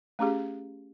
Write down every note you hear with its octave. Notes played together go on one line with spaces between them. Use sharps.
A3 C#4 G4 G#4